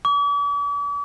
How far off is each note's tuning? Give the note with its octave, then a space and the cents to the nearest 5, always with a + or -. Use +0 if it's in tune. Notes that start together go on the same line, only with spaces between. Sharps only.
D6 -45